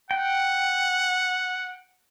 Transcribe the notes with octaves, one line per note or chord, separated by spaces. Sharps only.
F#5 G5